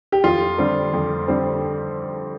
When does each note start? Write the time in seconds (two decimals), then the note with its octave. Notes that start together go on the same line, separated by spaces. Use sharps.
0.12 G4
0.24 F2 F4
0.58 D3 G3 C4
0.93 F2
1.28 D3 G3 C4